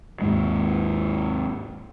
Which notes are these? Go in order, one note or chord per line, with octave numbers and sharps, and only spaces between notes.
D#2 G#2 G#3